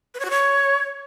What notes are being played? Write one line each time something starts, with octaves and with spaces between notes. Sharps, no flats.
B4
C#5
F#4
C#5